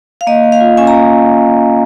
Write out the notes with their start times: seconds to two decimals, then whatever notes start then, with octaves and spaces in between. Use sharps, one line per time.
0.21 F5
0.27 A#3 D#5
0.44 A#3
0.52 F5
0.60 F4
0.77 C#4 G#5
0.87 A#5
0.94 A#3